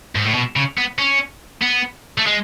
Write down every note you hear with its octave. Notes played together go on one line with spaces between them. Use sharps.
G#2
A2
B2
C#3
B3
C#4
B3
A3
G#3